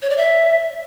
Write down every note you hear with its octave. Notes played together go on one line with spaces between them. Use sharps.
C#5
D5
E5